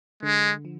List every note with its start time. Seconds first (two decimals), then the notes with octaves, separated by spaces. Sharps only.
0.23 D3 G#3
0.65 F3